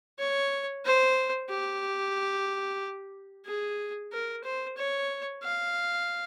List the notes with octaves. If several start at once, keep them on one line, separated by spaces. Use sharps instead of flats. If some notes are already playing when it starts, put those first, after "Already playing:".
C#5
C5
G4
G#4
A#4
C5
C#5
F5